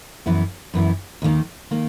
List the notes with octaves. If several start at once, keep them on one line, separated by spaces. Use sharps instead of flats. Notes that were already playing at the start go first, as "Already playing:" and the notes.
F#2 E3 B3 E4
F#2 E3 B3 E4
D#2 D#3 A#3
D#3 A#3